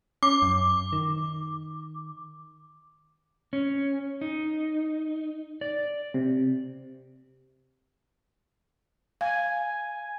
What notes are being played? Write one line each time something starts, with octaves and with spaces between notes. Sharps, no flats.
C#4 D6
F#2
D#3
C#4
D#4
D5
C3
F5 G#5